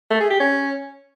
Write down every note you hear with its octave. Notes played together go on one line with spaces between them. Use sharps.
A3
G#4
G4
C#4